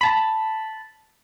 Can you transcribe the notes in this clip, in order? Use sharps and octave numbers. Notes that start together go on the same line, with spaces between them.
A5 B5